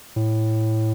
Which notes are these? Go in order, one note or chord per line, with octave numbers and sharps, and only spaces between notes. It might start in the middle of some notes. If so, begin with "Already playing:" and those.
A2